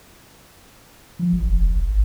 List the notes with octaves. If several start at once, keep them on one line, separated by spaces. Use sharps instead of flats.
F3
A1
F1
A#1
G#1